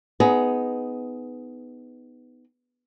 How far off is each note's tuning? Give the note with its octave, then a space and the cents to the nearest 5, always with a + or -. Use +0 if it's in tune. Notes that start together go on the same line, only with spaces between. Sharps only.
B3 +15 D#4 +0 G#4 +15